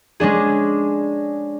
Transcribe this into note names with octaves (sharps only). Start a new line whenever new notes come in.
G#3 C#4 D4 G#4